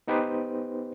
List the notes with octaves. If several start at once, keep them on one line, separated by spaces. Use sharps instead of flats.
B3 D#4 G4 B4 C5